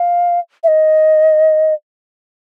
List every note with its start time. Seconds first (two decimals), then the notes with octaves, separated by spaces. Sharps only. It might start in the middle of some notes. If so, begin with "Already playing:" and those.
Already playing: F5
0.64 E5
0.68 D#5